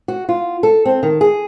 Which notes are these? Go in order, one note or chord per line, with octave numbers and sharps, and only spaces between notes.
F#4
F4
A4
C4
D#3
G#4